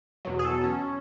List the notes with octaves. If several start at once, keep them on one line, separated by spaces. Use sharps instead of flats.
E2 B2 F#3
G#4
A4
C#4